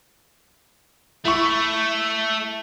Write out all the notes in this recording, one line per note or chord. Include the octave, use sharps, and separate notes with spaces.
A3 E4 C#6